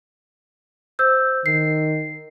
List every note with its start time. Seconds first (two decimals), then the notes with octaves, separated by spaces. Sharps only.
0.99 C5 E6 G6
1.46 D#3 C7